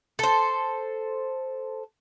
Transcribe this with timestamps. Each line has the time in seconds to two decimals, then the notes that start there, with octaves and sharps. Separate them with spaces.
0.19 A4 C5